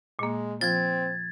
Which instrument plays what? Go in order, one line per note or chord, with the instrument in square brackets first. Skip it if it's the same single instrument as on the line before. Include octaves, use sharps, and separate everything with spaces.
[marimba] A#2 A#3 [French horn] G#3
[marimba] F3 F4 [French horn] C4 [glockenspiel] G#6 A6